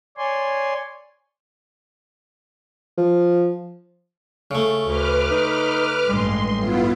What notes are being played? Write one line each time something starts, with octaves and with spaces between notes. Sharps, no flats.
C#5 D5 G#5 C6
F3
C#3 A3
D2 B4 D6 F6
D#4
A1 G2 G#3 C6
B3 E4 F4